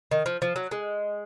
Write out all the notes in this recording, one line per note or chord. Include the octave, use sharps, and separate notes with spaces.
D#3
F3
F3
F#3
G#3